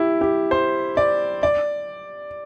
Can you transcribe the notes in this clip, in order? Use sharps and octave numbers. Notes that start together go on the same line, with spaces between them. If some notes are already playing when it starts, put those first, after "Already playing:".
Already playing: E4 G4
G4
C5
D5
D5